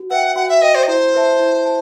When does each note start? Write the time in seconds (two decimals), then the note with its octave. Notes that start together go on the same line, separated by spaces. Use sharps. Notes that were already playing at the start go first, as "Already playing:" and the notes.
Already playing: F#4
0.10 B4 E5 F#5 G5
0.36 F#4 F#5
0.49 E5
0.61 B4 D#5 E5 G5
0.75 C5
0.83 D#5
0.88 E4 C5
1.14 B4 E5 A5
1.39 E4
1.65 A5